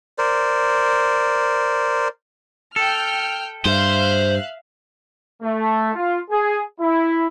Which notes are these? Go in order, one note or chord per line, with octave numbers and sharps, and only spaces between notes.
A#4 C5 D5
A4 G5 F6 G6
G2 C5 E5 F5 F#6
A3
F4
G#4
E4